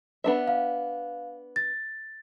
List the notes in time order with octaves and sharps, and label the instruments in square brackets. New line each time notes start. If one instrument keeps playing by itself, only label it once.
[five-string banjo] B3 D4 E5
[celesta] F5
A6